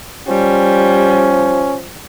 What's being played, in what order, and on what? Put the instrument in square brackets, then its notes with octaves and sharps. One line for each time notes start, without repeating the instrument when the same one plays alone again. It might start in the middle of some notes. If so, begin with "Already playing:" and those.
[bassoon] F3 [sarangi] G3 [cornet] C#4